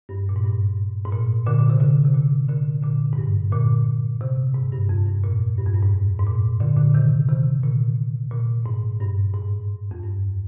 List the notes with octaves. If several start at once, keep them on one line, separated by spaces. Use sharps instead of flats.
G2
A#2
G#2
G2
G#2
A#2
A#2 D3
A#2
C3
A#2 D3
C3
A#2 D3
A#2 D3
A#2 D3
G#2
G2
A#2 D3
C3
G#2
G2
G2
F2
G2
A#2
G2
F2
G2
G#2
G#2
A#2
A#2 D3
A#2 D3
C3 D#3
C3 D#3
A#2 D3
A#2
G#2
G2
G#2
F2
G2